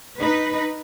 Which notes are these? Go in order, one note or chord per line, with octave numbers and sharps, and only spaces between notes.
D#4 B4